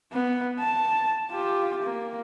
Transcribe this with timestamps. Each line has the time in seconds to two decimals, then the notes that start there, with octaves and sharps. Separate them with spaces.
0.12 B3
0.59 A5
1.31 F4 G4
1.83 A#3